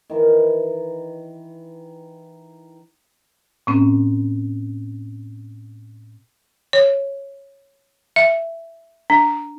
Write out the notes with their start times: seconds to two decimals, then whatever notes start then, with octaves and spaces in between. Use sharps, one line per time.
0.10 D#3 E3
3.67 A2 A#3 C4 C#4
6.73 C#5
8.16 E5
9.10 D4